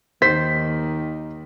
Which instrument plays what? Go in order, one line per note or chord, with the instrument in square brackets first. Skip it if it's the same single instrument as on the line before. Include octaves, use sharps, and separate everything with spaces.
[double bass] D#2 D#3 [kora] C5 [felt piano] B6